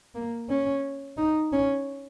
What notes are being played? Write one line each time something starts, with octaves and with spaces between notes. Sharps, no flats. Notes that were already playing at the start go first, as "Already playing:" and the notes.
A#3
C#4
D#4
C#4